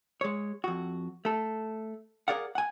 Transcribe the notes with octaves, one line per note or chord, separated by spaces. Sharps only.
G#3 C#5
F2 F#4
A3 A4
G#4 A#4 D5 F5 F#5
F#5 G#5